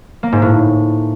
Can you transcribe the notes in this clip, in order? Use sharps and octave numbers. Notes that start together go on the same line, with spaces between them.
A#3
G#2
A2